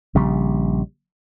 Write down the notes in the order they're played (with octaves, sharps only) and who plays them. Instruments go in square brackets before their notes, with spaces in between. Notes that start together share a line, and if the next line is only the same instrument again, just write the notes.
[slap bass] A#1 C#3 G3